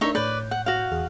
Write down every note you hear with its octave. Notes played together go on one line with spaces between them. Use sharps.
A3 D4 D#4 A#4 C#5 E5
A2 B4 C#5 D5 G6
F#5
F#4 F5
E2 G#4 F6